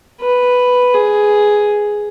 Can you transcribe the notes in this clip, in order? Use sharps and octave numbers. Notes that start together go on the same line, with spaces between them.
B4
G#4